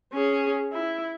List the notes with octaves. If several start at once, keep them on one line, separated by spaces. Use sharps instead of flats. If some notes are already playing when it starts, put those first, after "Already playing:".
C#4 G#4
E4